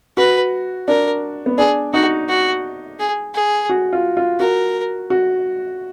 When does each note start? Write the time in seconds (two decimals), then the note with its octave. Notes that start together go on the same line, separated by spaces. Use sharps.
0.17 F#4 B4
0.88 D4 A#4
1.46 B3
1.58 D4 G#4
1.93 D#4 F#4
2.29 F#4
2.99 G#4
3.34 G#4
3.69 F#4
3.93 F4
4.17 F4
4.40 F#4 A#4
5.10 F#4